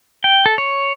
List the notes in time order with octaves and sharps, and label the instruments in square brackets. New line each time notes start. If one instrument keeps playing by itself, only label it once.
[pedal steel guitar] G5
A4
C#5